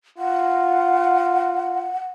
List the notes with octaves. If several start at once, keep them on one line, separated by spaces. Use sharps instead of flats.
F4 F#5